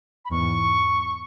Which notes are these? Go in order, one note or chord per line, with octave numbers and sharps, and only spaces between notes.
B5
E2 G#2 C#6